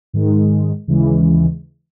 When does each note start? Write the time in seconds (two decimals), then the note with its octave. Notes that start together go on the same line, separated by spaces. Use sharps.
0.13 G#2 D#3 G#3
0.87 D#2 C#3 E3 G#3